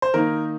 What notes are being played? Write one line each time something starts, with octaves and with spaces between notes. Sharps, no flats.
C5
D#3 A#3 D#4 A#4